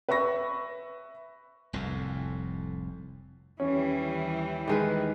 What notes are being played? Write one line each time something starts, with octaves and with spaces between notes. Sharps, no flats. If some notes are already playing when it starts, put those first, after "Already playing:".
B4 E5 B5 C#6 A#6
F1 C2 F2 A2
D#2 E3 G3 C#4
D#3 G#3 B4